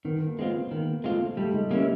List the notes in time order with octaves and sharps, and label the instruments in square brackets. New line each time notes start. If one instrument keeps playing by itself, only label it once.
[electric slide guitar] D#3 [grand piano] B3
[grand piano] A#3
[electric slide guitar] G#3 C4 F4 [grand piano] B3
[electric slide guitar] D#3 [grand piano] A#3
[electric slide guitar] G#3 C4 F4 [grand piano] A3
[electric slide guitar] G3 [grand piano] A3
[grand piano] G#3
[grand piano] G3 [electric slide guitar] A#3 C#4 E4